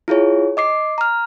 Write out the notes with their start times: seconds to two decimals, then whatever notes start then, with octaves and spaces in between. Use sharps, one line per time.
0.08 E4 F4 G#4 C#5
0.57 D#5 D6 C7
0.98 A#5 F6